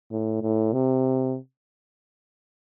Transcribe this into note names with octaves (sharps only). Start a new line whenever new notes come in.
A2
A2
C3